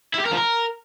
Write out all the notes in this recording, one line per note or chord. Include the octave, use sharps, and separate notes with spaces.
E4
G4
A#4
F3
A#4